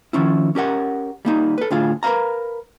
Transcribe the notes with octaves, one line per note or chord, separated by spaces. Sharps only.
D#3 F3 C#4 E4
C#4 G4 A#4 F#5
G3 A#3 D#4
A4 B4
D2 A2 D4 F4 G#4 F5
A#4 B4 D5 F5 A#5